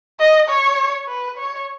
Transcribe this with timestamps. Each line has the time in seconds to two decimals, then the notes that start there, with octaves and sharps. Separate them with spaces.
0.19 D#5
0.49 C#5
1.08 B4
1.38 C#5